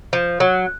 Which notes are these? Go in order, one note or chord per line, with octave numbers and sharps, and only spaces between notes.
F3
F#3